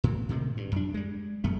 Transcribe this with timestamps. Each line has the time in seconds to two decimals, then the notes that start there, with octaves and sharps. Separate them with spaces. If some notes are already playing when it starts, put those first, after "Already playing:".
0.04 A2 E3
0.29 A2 C3 D#3 G#3
0.57 G2
0.72 F#2 D4
0.94 G3 G#3
1.44 E1 F#2 A3 B3